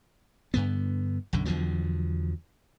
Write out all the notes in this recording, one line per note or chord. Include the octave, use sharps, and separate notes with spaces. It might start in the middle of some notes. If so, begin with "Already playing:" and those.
G2 D3 B3
B1 F#2 D3
E2 D3 F3 F#3